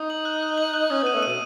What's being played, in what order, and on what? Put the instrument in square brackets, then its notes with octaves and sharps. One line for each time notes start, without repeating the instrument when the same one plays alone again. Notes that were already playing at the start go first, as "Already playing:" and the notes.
Already playing: [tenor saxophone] D#4 [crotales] D#6
[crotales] F#7
F#6
F#6
F#7
F#6
[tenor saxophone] C#4 [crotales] D#6
[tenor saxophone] B3 [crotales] D#7
[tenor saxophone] A3
[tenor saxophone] B2 [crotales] D#7